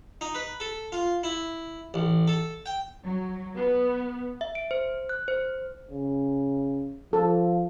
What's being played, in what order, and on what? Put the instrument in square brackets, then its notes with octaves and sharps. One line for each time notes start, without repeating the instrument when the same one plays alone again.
[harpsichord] D#4
B4
A4
F4
E4
A1
A4
G5
[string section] F#3
B3
[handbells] E5
D7
C5
F#6
C5
[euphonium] C#3
[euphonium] F3 [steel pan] A4